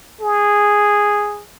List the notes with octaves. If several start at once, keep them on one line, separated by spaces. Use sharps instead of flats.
G#4